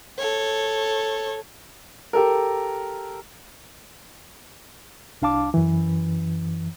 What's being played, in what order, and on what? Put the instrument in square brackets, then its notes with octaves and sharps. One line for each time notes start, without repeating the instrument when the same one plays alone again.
[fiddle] A4 C#5
[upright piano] G4 A4 A#4
[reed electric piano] C2 D4 F5 A5 D6
F#2 E3